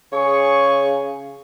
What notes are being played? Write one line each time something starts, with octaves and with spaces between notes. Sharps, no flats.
C#3 G#4 C#5 C#6